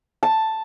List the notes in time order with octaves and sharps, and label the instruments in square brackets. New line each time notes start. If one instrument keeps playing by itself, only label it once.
[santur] A5